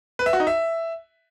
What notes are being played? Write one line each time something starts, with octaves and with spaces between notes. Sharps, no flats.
B4
E5
F#4
D#4
E5